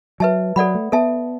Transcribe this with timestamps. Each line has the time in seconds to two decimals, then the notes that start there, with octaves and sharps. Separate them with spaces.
0.20 F#3 B4 E5 A5
0.56 F#3 A4 D5 F#5 B5
0.75 A3
0.92 B3 A4 E5 A5